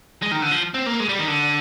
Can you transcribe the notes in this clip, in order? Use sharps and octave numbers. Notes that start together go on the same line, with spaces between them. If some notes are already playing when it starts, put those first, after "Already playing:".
G#3
D#3
D3
F3
C4
A#3
G#3
G3
D#3
D3